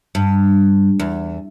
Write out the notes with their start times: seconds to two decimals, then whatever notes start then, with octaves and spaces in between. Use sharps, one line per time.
0.15 G2
1.00 E2